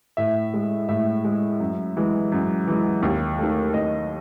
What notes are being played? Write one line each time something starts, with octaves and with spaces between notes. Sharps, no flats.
A2 E5
G#3
A2 E5
G#3
F#2
E3 G#3
F#2
E3 G#3
D#2
D#3 A3
D#2 D#5